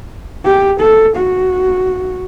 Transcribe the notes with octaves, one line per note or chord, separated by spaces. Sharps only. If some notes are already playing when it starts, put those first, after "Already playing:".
G4
A4
F#4